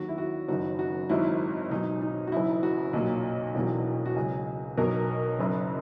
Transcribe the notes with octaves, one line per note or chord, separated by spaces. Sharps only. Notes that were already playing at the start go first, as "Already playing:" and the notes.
Already playing: D#2 D#3 F#3 F#4
E4
F#4
F#1 F#2 D#3 F#4
F#4
G#1 G#2 F#3 E4
B1 B2 F#3 D#4
D#4
F#4
F#1 F#2 E3 E4
F#4
B1 A#2 F#3
E1 E2 B2 F#3
F#4
C#2 C#3 F#3 G#4
B1 B2 F#3 A#4
F#1 F#2 C#3